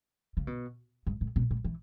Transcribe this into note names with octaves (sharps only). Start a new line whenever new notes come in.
C#3
B2
G2
A2
B2
A2
E3